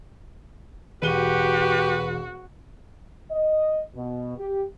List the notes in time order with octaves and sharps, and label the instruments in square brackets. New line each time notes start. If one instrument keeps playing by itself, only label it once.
[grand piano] E1 D#7 G7 [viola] F#4 [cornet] G4 [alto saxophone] B4
[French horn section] D#5
B2
G4